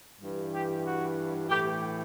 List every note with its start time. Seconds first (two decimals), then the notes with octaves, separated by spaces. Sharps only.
0.21 G2 E3
0.52 G4
0.85 F#4
1.49 A2 E3 G4